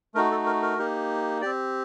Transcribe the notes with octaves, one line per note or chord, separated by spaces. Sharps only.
A3 D#4 F#4 A#4
A4
A#4
A#4
A#3 D#4 G4
C4 G4 D5